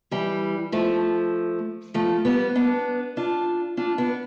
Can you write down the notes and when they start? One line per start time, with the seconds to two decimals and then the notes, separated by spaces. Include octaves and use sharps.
0.11 E3 G3
0.72 F3 A3
1.94 F3 A3
2.25 G3 B3
2.55 B3 D4
3.17 D4 F4
3.77 D4 F4
3.98 B3 D4